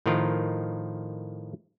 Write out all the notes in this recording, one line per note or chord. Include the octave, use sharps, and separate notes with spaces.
A2 D#3 F3 F4 A#4